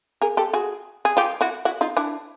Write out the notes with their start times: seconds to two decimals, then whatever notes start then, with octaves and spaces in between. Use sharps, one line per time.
0.22 G#4 A#4
0.37 G4 A4
0.53 F#4 G#4
1.05 G#4
1.17 F4 G4
1.41 E4 F#4
1.65 E4 F#4
1.81 D#4 F4
1.97 D4 E4